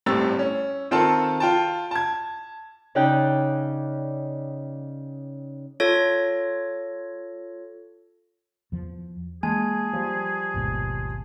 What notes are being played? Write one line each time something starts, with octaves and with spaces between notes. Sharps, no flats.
G1 A2 G3 C4 E6 A6
C#4
D#3 C4 F4 A4 A5
F4 G5 A5
A5 G#6
C#3 C#4 D#4 D5 G5 F#6
F4 A4 C#5 G#6 A#6
E2 F3
E3 G#3 A#3 G#4 G#5 A5 G#6
F3 G3
G#1 D#2 B2